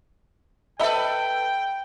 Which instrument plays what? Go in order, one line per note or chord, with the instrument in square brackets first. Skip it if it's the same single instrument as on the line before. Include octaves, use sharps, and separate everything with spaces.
[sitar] A4 B4 [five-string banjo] D#5 E5 B5 [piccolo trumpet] G5